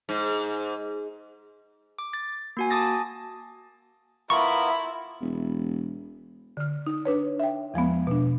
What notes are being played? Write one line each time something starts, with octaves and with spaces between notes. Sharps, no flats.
G#2
D6
A6
A#3 F#4 G#5
G#5 A5 D6 D#6 A6 A#6
B3 E4 F4 A#4 B5 C#6
E1
D3 F6
D#4
D4 B4 C#5
E5 G5
E2 F3 G#3 B3
B2 D4